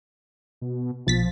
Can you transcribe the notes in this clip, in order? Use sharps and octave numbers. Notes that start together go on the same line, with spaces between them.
B2
B1 F3 A6 B6